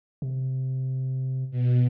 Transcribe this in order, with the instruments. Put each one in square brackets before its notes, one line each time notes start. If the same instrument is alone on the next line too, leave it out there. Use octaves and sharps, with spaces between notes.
[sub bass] C3
[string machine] B2